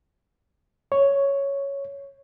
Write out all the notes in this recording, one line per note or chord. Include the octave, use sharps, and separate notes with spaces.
C#5